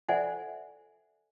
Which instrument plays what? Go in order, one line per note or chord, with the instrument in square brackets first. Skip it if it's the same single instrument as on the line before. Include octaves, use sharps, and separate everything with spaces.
[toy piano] A4 C5 D5 E5 F#5 G#5